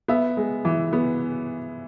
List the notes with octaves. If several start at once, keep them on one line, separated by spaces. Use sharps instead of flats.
B3 E5
G#3
E3
B3